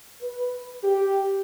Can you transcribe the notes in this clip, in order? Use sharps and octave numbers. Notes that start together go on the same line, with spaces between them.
B4
G4